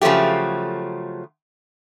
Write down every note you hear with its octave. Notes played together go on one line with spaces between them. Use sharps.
C#3 F3 F#3 A3 G4